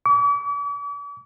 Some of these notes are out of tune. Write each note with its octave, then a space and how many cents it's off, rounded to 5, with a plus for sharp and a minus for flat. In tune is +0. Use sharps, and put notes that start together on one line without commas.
D6 -45